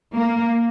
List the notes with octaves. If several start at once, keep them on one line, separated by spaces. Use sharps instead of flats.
A#3